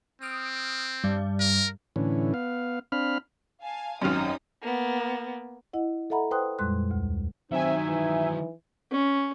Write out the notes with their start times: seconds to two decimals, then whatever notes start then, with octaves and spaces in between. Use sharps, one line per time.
0.22 C4 D#6 F6 D7
1.04 G2 G3
1.40 A#4
1.96 A2 D3 E3 C#4
2.34 B3 F5
2.92 C4 D4 F5 B5 F6
3.63 F5 G#5 A5
4.02 G#1 F#2 C#4 D#4 G4 D#6 F6
4.62 A#3 B3
5.73 E4 D#5 F#5
6.10 A4 D#5 E5 F#5 A#5 B5
6.31 B4 C5 G5 C6 D#6 F#6
6.59 F2 A#2 G3 G#3 C6 F#6
6.91 D2
7.51 D#3 F#3 C4 D#4 E5 G#5
7.88 E3
8.91 C#4